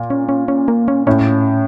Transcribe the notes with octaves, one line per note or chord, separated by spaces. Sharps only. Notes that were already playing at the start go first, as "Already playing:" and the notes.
Already playing: A#2
C#4
C#4
C#4
A#3
C#4
A2 C#4